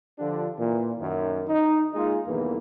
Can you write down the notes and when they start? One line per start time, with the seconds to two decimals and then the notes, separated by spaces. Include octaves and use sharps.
0.19 D3 F3 D4 F4 G4
0.58 A#2 E3
0.99 F#2 D#3
1.48 D#4
1.94 G#3 A#3 D#4 F4 G#4
2.27 B1 E2 G2 D#3 E3 A#3